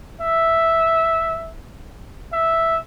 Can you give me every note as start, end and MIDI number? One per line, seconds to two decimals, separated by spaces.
0.21 1.54 76
2.33 2.79 76